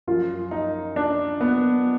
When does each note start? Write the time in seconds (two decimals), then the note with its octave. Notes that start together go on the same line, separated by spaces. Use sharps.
0.07 F#2 F3 F4
0.51 D#4
0.96 D4
1.41 B3